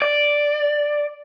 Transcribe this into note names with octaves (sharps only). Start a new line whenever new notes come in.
D5